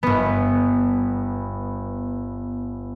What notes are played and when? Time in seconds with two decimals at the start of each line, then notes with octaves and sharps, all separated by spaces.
0.03 G1 B3